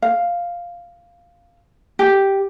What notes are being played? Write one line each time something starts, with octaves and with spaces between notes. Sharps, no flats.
F5
G4